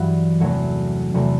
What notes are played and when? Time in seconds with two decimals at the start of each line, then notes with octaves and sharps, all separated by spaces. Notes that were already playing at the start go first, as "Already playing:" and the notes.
Already playing: G2 E3 F#3 G3 F#4
0.40 E2 C3 F#3 A3
1.14 E2 C3 F#3 A3